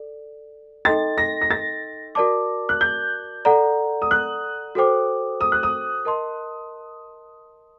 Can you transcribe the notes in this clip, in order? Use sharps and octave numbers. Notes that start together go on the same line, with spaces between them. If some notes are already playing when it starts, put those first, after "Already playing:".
Already playing: A4 D5
D#4 A4 D#5 G5 C6 A6
A#6
A#6
A6
F#4 A#4 D5 A5 D6
F#6
G6
A4 D5 F#5 A#5
D#6
F#6
F#4 A4 C5 G5 D6
D#6
F#6
D#6
A#4 D#5 A5 C6